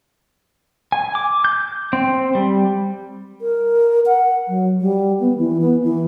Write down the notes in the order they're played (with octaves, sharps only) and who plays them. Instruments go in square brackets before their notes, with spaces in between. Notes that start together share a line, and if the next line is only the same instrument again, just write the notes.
[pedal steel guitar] G#5
D6
G6
C4
G3
[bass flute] A#4
F#5
F#3
G3
B3
E3
B3
E3